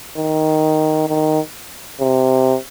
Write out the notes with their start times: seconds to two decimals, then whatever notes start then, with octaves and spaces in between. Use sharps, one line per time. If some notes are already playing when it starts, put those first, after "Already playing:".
0.17 D#3
1.08 D#3
2.00 C3